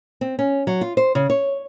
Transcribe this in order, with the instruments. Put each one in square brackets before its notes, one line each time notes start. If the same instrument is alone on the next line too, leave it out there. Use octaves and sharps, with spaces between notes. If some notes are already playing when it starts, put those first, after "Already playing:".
[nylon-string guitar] C4
C#4
F#3
F4
C5
C#3
C#5